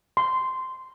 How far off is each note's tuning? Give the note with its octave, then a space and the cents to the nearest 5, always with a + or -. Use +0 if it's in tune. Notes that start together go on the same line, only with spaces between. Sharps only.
C6 -10